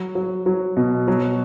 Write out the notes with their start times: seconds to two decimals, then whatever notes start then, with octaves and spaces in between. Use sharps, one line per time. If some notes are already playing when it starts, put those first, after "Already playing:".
Already playing: F#3
0.15 F#3
0.46 F#3
0.77 B2
1.08 F#3